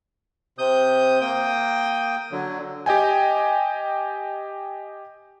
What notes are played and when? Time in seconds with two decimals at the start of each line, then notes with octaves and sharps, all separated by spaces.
0.58 C3 D#6 G6
1.21 A#3 G5 D#6
2.32 D3 F#3
2.86 G4 D#5 G5 G#5